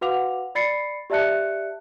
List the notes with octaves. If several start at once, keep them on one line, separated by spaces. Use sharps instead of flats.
F#4 B4 F5 F#5 D6 F7
D5 B5 A6 C7 C#7
G4 D5 E5 A5 F#6 C#7